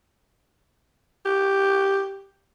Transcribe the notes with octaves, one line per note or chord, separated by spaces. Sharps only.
G4